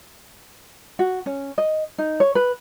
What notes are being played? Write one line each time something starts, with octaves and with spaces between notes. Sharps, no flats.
F#4
C#4
D#5
D#4
C#5
B4